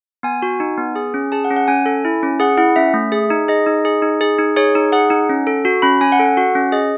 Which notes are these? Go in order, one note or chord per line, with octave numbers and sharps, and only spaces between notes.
B3 G#5
F#4
D#4
B3
G#4
C#4
G#4 A5
F#5
C#4
F#5
C#4 G#5
A4
E4
C#4
G#4 F#5
E4 F#5
C#4 E5
A3
G#4
D#4
G#4 D#5
D#4
G#4
D#4
G#4
D#4
G#4 C#5
D#4
G#4 F#5
D#4
C#4
A4
F#4
C#4 B5
C#4 G#5
F#5
A4
F#5
F#4 F#5
C#4
G#4 D#5